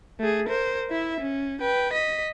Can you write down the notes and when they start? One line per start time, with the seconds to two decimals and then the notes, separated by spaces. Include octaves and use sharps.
0.20 A3 G#4
0.48 A#4 C5
0.90 E4 E5
1.20 C#4
1.61 B4 G5
1.93 D#5 B6